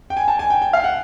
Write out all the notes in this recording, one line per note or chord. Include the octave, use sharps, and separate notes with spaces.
G5
G#5
A5
G#5
G5
G5
F5
F#5